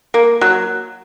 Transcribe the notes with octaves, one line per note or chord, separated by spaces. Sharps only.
A#3
F#3